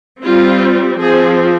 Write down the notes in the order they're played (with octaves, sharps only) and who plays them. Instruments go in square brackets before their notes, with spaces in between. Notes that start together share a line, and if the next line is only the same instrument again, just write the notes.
[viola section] G3 C4 F4
F3 C4 G#4